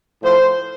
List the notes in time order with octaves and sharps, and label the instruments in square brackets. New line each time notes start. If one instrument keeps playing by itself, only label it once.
[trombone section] A2 F3 C5